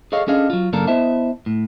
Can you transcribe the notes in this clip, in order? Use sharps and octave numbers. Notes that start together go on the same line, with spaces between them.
G#4 A4 C#5 D#5 F5
C#4 D4 G#4 A4 D#5 F5
F#3 F4
F#2 C#3 A#3 D4 A4 A#4
B3 E4 C5 D#5 E5 A5
A2